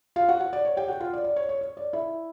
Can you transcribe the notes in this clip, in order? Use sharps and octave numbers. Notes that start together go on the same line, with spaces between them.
F4 F5
F#4 F#5
F#4 F#5
D5
C#5
G4 G5
F#4 F#5
F4 F5
D5
D5
C#5
C#5
C#5
D5
E4 E5